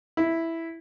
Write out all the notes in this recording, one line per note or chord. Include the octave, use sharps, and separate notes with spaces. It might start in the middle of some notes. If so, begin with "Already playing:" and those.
E4